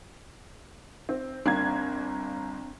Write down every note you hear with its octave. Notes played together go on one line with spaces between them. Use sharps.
C4
G1 A#3 C4 D4 G#6